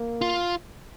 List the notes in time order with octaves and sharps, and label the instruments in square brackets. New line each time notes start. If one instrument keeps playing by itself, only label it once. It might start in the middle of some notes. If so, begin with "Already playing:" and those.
Already playing: [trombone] A#3
[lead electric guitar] F4